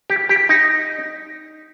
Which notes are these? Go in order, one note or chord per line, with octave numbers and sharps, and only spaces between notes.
G4
G4
D#4